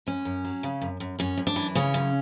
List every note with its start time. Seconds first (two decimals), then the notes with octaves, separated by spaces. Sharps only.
0.07 F#2 C#4
0.25 F#2
0.44 F#3
0.63 C#3
0.81 F#2
1.00 F#2
1.19 F#2 C#4
1.37 F#2
1.47 D4
1.56 E3
1.75 C#3 C#4
1.94 F#2